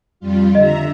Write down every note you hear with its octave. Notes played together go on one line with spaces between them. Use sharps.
F2 G3 F4
D3 D#5 E5 A#5